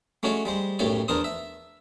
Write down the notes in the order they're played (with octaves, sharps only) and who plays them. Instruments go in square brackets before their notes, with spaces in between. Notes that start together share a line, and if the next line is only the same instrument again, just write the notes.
[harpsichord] G#3 A3 C#4 F#4 C#5 D5
G3 G#3 C5
B1 F#2 A2 G4 C#5 D5
E2 D4 A#4 C5 D#6
E5